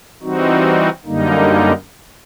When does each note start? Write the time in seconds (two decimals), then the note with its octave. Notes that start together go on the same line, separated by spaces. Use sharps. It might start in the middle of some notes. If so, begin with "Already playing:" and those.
0.22 E3 G3 C4 D#4 F#4
1.05 F#2 D3 G3 A#3 D#4